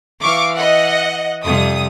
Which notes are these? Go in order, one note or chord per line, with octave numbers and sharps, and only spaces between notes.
E3 F5 C#6 D6
D#5 F#5
F2 C3 G3 D#6